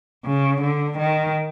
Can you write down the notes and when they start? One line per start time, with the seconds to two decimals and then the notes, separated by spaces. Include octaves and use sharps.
0.25 C#3
0.62 D3
0.98 D#3